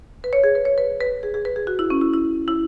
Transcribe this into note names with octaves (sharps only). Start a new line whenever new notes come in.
B4
C#5
G#4
B4
C#5
B4
B4
G#4
G#4
B4
G#4
F#4
E4
C#4
E4
E4
E4